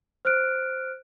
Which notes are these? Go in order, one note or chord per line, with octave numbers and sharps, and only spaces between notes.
C5 F6 F#6 D7